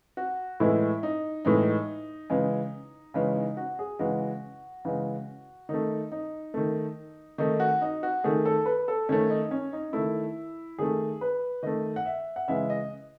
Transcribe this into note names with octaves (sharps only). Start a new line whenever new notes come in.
F#4
A2 E3 G#3 E4
D#4
A2 E3 G#3 D#4
C#3 E3 G#3
C#3 E3 G#3 C#4
D#4
F#4
G#4
C#3 E3 G#3 F#4
C#3 E3 G#3
D#3 A3 D#4
D#4
D#3 A3
D#3 A3 D#4
F#4
D#4
F#4
D#3 A3 G#4
A4
B4
A4
D#3 A3 C#4
D#4
C#4
D#4
D#3 A3 E4
D#3 A3 G#4
B4
D#3 A3 D#5
F#5
E5
F#5
C#3 E3 G#3 E5
D#5